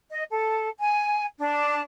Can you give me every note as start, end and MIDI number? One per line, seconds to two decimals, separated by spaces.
0.09 0.23 75
0.30 0.69 69
0.79 1.25 80
1.38 1.79 62